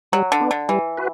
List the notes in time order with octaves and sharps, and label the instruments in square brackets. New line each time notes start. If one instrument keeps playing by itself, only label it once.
[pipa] F#3 [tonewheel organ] G3
[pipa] D3
[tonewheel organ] B3 D4
[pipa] D3
[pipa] E3 [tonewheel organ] G3
[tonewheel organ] F#4 B4